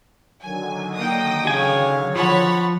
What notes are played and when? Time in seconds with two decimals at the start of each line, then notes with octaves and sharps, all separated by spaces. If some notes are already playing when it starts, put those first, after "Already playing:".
0.42 D3 D#3 F#3 G#5
0.96 A#3 D#4 G5 D#6
1.47 C#3 G#4 C#5 F5 G#5
2.16 F3 C#5 F#5 B5 A6